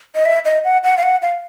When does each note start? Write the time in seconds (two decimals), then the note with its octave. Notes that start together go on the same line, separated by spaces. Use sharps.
0.15 D#5
0.26 E5
0.45 D#5
0.64 F#5
0.84 F#5
0.97 F5
1.03 F#5
1.22 F5